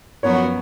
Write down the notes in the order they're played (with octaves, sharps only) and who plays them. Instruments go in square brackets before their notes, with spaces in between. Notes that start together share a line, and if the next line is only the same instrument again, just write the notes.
[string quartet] F#2 F3 B3 F#4 A#4 [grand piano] C#5